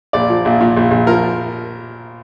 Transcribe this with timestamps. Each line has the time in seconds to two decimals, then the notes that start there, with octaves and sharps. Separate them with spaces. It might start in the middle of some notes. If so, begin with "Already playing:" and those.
0.13 A#1 D5
0.29 F3
0.45 A#1
0.61 A#2
0.77 A#1
0.91 A#1
1.07 F3 A#4